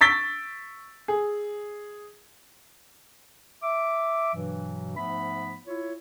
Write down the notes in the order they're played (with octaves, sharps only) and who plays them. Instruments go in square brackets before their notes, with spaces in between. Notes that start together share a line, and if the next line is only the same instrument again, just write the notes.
[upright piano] C#6 E6 A6 B6 D7 G7
G#4
[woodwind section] E5 D6
G2 B2 E3 F#3
G#2 F3 A3 B3 E5 B5
E4 F4 C#5